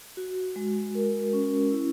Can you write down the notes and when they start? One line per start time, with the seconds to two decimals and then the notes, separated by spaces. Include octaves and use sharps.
0.17 F#4
0.56 G#3
0.95 A#4
1.33 C#4
1.72 E4